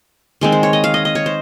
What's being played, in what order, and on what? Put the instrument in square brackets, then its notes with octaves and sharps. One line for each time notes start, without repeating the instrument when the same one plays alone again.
[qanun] D#3 G#3 C4
C5
C#5
D#5
F5
D#5
D#5
C#5
C5